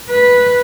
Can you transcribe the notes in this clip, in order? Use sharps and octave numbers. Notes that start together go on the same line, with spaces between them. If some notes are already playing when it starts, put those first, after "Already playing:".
B4